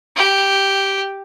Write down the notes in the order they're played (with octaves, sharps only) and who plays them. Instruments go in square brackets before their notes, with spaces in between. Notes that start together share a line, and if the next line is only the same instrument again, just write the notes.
[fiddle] G4